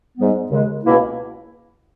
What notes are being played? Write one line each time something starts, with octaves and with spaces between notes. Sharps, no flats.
G#2 G3 B3
D#2 C#3 G#3
C#2 B2 A#3 E4